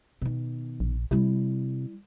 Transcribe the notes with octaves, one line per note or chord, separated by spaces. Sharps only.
B2 D#3
A#1
C3 G3 E4